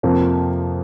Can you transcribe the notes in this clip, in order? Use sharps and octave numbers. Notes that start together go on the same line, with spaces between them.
F2 C3 F3 A#3